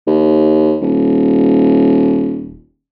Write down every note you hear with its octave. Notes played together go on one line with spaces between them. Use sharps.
D#2
D#1